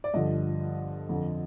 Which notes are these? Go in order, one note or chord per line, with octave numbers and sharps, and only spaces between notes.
D5
G1 G2 D3 F3 D#5
F2 D3 F3